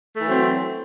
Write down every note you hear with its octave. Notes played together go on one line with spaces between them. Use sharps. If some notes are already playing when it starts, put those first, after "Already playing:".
E3 F#3 A3 C4